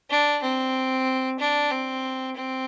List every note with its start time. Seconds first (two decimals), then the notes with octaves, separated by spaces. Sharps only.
0.10 D4
0.42 C4
1.39 D4
1.71 C4
2.36 C4